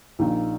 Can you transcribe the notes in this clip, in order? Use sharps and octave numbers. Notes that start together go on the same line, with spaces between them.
A#1 A#2 D#4